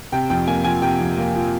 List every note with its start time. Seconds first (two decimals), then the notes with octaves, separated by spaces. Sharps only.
0.12 C3 G5
0.30 F2 G5
0.47 A#3 G#5
0.64 F3 G#5
0.82 C3 G5
1.00 F2
1.17 A#3
1.34 F3